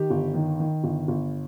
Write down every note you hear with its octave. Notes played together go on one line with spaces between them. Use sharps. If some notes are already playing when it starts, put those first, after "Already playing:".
Already playing: D#3 G4
G1
D#3
D#3
G1
G1